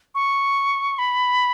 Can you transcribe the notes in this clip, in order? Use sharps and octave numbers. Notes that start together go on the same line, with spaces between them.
C#6
B5